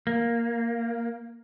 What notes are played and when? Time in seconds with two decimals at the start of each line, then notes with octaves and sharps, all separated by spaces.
0.07 A#3